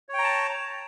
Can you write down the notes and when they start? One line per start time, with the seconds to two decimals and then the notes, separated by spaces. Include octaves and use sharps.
0.09 C#5
0.14 G5
0.19 A#5
0.24 A5